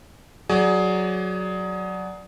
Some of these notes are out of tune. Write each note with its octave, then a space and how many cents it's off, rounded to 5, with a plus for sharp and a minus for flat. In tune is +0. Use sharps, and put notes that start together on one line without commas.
F#3 +0 G#4 +15 D5 +0